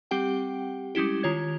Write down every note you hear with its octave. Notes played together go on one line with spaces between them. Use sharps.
G3 C4 G4 F#5 G5
G3 G#3 C#4 E4 G4
D#3 F4 C#5 G#6